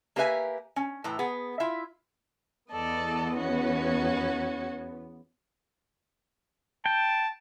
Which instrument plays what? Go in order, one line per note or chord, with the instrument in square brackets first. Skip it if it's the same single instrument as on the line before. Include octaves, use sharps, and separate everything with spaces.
[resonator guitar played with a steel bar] A#3 G4 A#4 B4 E5 G#5
C#4
A2 E3 A#5
B3 G#4
E4 F4 E5
[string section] E2 B3 [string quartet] A4 D5 D#5
[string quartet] C#4 F#4
[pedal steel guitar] G5 [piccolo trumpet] A5